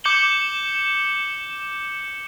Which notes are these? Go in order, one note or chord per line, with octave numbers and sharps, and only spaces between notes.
D6 G6 C#7 E7 F#7 G7